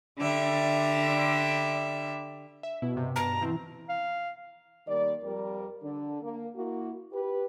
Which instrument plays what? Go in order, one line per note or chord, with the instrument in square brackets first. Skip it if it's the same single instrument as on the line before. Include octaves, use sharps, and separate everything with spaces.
[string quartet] D3 G3 E5
[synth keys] E5
[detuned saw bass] B2 [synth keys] E4
[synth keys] G2 C3
[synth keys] G2 A5 [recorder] A#5
[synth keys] B2 C4 [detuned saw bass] E3
[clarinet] F5
[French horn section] D#3 G3 A#3 D5
F2 G3 A#4
D3 D4
A#3
A#3 E4 F#4
G4 B4